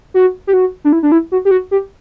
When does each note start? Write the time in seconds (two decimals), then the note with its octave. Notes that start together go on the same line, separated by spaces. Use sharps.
0.14 F#4
0.47 G4
0.53 F#4
0.84 D4
0.93 E4
1.03 D4
1.12 E4
1.32 F#4
1.45 G4
1.51 F#4
1.71 G4